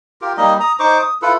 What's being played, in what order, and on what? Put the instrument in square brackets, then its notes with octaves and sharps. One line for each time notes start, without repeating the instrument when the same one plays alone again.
[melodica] F4 G4 A#4
G3 A#3 D#4 D#5
A#5 D#6
D#4 C5 C#6 D6
D#6
E4 F4 A4 B4